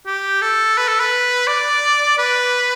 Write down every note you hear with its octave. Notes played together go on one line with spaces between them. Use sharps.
G4
A4
B4
A4
B4
D5
B4